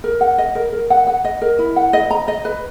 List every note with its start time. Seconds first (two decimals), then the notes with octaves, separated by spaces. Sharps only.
0.04 A#4
0.21 F#5
0.38 D#5
0.55 A#4
0.73 A#4
0.90 F#5
1.07 F#5
1.25 D#5
1.42 A#4
1.59 E4
1.76 F#5
1.93 D#5
2.11 A#5
2.28 D#5
2.45 B4